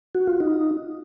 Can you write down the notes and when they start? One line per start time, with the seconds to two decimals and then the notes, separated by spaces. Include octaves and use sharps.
0.15 F#4
0.27 F4
0.40 D#4